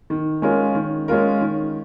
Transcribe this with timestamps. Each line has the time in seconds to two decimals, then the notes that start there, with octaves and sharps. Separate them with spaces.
0.10 D#3
0.42 G#3 C#4 F4 A#4
0.75 D#3
1.08 G#3 C#4 F4 A#4
1.41 D#3